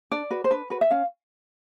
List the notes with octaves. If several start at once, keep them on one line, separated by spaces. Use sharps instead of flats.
D4 D5
F#4 B4
C5
D4 B4
F#4 B4
E5
C#4 F5